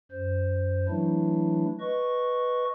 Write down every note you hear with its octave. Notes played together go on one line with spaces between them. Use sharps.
F#2 C5
E3 F#3 A3 D4 E4
B4 D#5 C#6